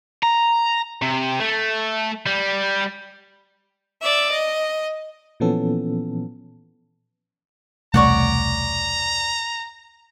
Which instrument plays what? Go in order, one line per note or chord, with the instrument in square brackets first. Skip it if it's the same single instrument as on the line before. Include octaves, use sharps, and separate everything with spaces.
[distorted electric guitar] A#5
C3
A3
G3
[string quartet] D5 E5
D#5
[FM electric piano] A#2 E3 F3 B3 C#4 A4
[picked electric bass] E1 C2 A3 [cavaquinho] C#5 D5 F#5 [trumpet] A#5